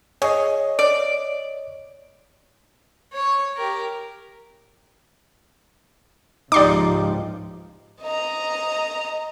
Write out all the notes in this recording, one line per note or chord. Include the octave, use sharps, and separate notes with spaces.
G#4 C#5 D#5
D5
C#5 C#6
G4 A#4
C#2 G#2 F3 D#4 G4 D5 C6 D6
D#5 A#5